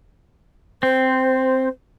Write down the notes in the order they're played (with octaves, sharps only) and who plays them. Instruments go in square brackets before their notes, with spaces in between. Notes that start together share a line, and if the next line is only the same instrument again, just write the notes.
[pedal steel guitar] C4 [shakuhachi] C5